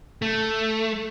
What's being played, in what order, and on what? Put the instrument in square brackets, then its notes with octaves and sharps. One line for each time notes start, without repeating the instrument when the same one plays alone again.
[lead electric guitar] A3